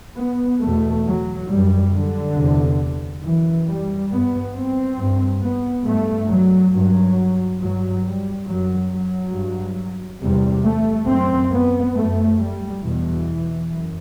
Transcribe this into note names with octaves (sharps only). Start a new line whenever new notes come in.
B3
E2 B2 A3
F#3
F#2 G3
D3
E2 C3
F#2 E3
G3
G2 B3
C4
G2
B3
G2 A3
F#3
G2 F#3
G2 F#3
G3
F#2 F#3
F#3
G2
E2 C3 G3
A3
F#2 C4
B3
F#2 A3
G3
E2 B2 E3
F#2